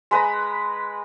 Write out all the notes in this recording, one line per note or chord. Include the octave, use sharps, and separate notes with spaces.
G#3 B4 A#5 B5